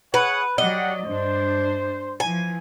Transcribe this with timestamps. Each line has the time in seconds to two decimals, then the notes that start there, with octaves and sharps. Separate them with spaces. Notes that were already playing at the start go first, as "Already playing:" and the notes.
0.14 G#4 B4 C#5 F#5
0.58 F#3 G4 D5 D#5 F#5
1.06 G2 D4 C5
2.20 E3 F3 G#5